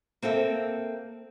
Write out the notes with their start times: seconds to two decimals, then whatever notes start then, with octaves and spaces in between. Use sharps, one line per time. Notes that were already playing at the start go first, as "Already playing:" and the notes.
0.22 A#3 C4 A4 E5